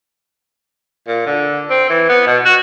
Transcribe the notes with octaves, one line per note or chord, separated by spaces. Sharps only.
A#2
D3
C4
E3
B3
B2
F#4